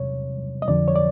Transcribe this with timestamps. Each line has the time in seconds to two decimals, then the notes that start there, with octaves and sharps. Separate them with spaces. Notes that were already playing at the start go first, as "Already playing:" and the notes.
Already playing: E2 C3 C#5
0.62 D#5
0.68 F2 D3 F3 D5
0.88 C#5
0.96 D5